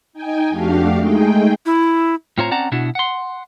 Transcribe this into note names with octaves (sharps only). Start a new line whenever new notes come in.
D#4 G5 G#5
F2 A3 D4 F#4 G4 F5
G#3 A3 D#4 G#4 G5
E4
A2 C4 F4 C5 C#5 A#5
C4 C#4 D5 F#5 A5 A#5
B2 D4 E4 F#4
F#5 C6